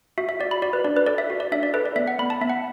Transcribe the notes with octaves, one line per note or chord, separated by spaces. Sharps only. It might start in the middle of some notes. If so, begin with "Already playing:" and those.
F#4 E5
E5
F#4 D5
B5
F#4 D5
B4
D4 D5
B4
A4 D5
E5
F#4
D5
D4 E5
D5
A4 B4
D5
B3 E5
F#5
B3 B5
A5
B3 E5
F#5